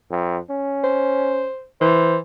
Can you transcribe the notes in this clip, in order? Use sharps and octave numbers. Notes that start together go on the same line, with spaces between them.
F2
C#4
C5
E3 C5